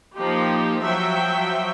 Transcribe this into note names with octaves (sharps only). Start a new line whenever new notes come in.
F3 A#3 D#4 G4
F3 F#3 E5 G5